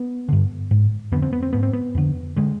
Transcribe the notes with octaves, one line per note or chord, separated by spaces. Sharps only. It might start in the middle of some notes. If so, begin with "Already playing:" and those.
Already playing: B3
G2 D3
G#2
F2 D3 B3
C4
B3
C4
G#2 B3
C4
B3
F2 D3
D3 G#3